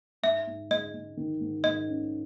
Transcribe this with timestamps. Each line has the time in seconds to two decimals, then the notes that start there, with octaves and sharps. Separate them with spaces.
0.23 G#2 E5
0.47 G#2
0.71 G#3 D#5
0.94 G#3
1.17 D#3
1.41 G#2
1.64 G#2 D#5
1.88 C#4